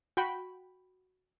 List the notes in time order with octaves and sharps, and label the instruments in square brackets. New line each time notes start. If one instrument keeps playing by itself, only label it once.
[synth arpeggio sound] F#4 G5 B5